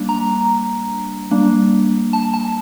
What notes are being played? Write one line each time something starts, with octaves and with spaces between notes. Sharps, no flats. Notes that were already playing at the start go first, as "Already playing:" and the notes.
Already playing: G3 A#3 D4
A#5
G3 A#3 D4
A5
A5